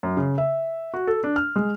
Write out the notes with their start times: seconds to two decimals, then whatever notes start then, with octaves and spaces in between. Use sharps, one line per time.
0.03 F#2
0.17 C#3
0.38 E5
0.94 F#4
1.07 A4
1.24 D4
1.36 F6
1.56 G#3